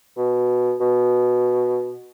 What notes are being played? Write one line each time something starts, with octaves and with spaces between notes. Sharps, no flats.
B2
B2